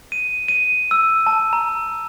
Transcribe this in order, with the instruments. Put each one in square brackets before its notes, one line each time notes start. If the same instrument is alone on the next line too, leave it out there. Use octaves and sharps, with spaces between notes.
[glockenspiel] D#7
D#7
E6
A5
A#5